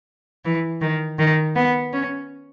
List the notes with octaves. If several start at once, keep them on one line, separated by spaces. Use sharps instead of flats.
E3
D#3
D#3
B3
C#4